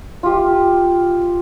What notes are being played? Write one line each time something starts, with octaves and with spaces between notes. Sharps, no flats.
F4 G4